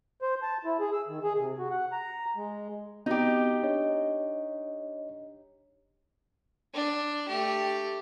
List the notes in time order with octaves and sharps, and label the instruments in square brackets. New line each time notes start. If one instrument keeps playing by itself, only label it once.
[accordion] C5
A5
E4
G#4
E6
D#3
G#4
C3
F#4
F#5
A#5
G#3
[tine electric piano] B3 C4 F#4 [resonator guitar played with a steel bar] D#4 G4
[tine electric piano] D4 C#5 D#5
[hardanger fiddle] D4
A3 G4